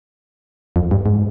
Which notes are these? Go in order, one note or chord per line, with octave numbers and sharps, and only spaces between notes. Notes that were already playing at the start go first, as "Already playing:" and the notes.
F2
G2
G#2